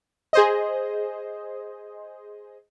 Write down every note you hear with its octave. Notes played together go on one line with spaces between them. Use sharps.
G#4 C5 D#5